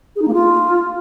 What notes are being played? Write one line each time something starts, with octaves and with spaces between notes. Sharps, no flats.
G#4
D#4
A#3
F4